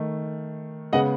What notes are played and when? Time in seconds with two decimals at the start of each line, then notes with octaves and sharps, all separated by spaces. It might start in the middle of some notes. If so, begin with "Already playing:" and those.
Already playing: D#3 A3
0.93 C#3 G#3 B3 D#5 F#5